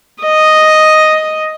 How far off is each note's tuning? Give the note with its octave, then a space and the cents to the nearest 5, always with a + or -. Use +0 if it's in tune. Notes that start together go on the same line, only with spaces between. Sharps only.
D#5 +0